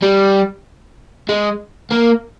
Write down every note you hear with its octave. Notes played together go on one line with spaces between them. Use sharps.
G3
G#3
A#3